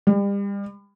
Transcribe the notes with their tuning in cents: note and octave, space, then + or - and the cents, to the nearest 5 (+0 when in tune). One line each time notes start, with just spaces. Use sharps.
G3 +35